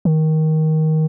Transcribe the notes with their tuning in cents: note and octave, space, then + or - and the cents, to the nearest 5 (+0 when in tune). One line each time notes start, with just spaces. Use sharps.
D#3 +15